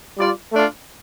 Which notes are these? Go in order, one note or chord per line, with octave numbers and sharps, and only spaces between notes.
G3 F4 D5
A3 D4 F4